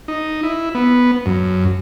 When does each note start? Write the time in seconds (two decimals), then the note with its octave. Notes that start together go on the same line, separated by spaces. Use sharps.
0.08 D#4
0.43 E4
0.75 B3
1.26 F#2